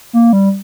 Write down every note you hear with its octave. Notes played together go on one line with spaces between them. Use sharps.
A#3
G3